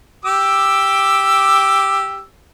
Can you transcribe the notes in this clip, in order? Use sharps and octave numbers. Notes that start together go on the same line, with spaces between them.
G4 D6 E6